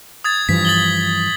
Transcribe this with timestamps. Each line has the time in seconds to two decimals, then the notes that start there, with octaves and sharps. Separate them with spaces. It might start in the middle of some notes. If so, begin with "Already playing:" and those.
0.24 D#6 G#6 A6
0.49 G2 E3 F3 B6
0.65 A6 F#7 G7